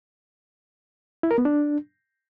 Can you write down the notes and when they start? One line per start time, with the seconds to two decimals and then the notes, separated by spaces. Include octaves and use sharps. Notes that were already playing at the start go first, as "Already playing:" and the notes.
1.23 E4
1.31 A#4
1.38 B3
1.45 D4